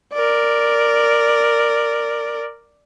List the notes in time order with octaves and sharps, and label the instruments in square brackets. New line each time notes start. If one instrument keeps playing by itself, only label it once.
[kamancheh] A#4 D5